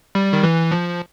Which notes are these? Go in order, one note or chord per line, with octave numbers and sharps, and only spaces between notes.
G3
D#3
E3
F3